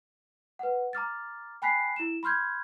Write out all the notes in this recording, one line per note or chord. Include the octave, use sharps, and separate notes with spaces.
B4 F#5
A#5 D6 F6 A6
G5 G#5 B5 F#6 B6 C7
E4 E7
B5 C6 F6 G6 G#6